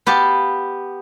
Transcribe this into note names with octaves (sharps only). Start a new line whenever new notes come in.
B3 G4 F5 A5